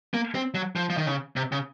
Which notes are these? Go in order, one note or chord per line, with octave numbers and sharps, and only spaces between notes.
A#3
C4
F#3
F3
F3
D#3
C#3
C3
C#3